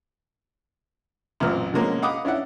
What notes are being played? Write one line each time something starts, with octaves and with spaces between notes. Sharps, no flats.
A1 F#2 A#2 E3 C4 F6
B2 D3 F3 G#3 A#3 C#4
D#5 F5 F#5 B5 D6 D#6
C#4 D4 E4 F#5